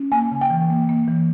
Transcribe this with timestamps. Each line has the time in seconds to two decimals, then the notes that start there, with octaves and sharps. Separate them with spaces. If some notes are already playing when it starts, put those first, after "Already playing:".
Already playing: C#4
0.12 A#3 G#5
0.31 C#3
0.41 G5
0.50 E3
0.70 A#3
0.89 A#3
1.08 E3